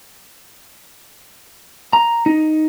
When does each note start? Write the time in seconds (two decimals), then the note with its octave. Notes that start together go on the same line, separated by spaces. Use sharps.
1.93 A#5
2.26 D#4